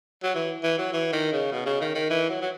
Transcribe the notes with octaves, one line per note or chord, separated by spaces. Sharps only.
F#3
E3
E3
F#3
E3
D#3
C#3
B2
C#3
D#3
D#3
E3
F#3
F#3